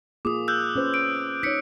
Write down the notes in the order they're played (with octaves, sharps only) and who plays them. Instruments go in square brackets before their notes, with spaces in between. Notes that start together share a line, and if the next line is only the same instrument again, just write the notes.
[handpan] A#3 F4 G#4 [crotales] D6 D#6
[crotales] E6 F#6 G6
[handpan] C#4 B4 C5
[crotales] D7
[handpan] D#4 C#5 [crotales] B6 C#7